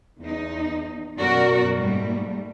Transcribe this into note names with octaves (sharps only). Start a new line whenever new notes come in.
E2 D#4
F#2 B2 F#4 A#4 D5
G#2 G3 A3 A#3